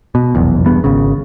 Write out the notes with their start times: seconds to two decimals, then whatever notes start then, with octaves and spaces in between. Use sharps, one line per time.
0.15 B2
0.35 F1 B1 E2
0.66 E2 G2 B3
0.84 G#1 C#3